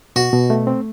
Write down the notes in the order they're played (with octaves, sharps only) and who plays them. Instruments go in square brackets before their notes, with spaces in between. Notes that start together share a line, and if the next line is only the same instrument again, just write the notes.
[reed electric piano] B2 [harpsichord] F#4
[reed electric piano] B2
A3
C4